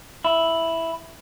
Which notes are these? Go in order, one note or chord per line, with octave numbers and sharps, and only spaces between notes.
E4